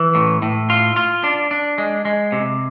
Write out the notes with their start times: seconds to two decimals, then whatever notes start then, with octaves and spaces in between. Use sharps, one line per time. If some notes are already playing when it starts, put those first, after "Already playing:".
Already playing: E3
0.15 A2
0.42 A2
0.70 F4
0.96 F4
1.24 D4
1.51 D4
1.78 G#3
2.05 G#3
2.32 C3